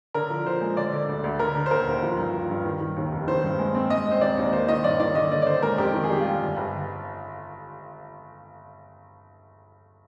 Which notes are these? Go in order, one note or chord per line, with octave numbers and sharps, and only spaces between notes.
D3 A#4
F3
F3 C5
G#3
D3 D5
D3
D2
D2
D3 A#4
D3
C5
D#2 A#4
D#2
F3
G2
F3
G2
D#3
D#3
D#2
F1
D#3 C5
G2
G#3
C4
G#3 D#5
C4
C5
D#2 D5
D#2
A#3 C5
D#3 D#5
G2 D5
D#3 D5
D3 D#5
D3 D5
D5
D3 C5
G#3 A#4
F2 G4
D#3
G#4
G3 G4
G3 F4
G1
G1